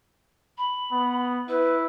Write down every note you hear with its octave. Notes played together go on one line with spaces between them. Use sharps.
B5
B3
E4 B4